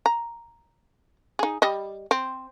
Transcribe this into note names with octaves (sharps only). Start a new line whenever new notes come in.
A#5
D#4 G#4
G3 D#5
C4